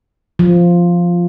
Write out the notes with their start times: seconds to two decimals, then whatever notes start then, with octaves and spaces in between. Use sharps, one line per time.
0.39 F3